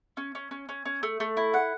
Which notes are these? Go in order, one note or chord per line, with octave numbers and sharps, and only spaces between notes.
C#4
C#4
C#4
C#4
C#4
A3
A3
E4
F#5